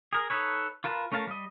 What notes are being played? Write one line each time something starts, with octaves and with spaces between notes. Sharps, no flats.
G#4 A#4
D#4 A4 B4 C#5
F4 A#4 B4 A5
A3 C#4 A#4 F5 A5
G3 D#5